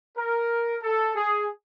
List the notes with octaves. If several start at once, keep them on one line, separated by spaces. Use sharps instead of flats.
A#4
A4
G#4